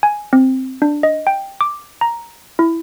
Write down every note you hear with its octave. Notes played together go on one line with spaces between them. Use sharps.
G#5
C4
D4
D#5
G5
D6
A#5
E4